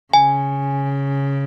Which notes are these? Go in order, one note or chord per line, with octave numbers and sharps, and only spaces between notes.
C#3 G#5